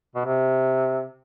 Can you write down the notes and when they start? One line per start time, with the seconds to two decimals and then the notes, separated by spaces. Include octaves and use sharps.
0.15 B2
0.25 C3